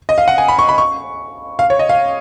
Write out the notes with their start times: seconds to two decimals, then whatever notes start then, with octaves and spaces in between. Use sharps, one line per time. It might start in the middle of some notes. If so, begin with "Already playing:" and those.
0.09 D#5
0.18 F5
0.28 F#5
0.38 G#5
0.48 B5
0.59 C#6
0.69 B5
0.78 C#6
1.59 F5
1.70 C#5
1.79 D#5
1.89 F5